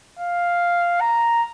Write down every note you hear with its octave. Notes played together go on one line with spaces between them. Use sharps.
F5
A#5